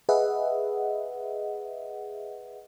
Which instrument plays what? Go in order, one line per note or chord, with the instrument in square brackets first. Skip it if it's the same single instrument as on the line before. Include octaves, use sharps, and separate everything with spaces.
[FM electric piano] G#4 B4 D#5 E5 F#5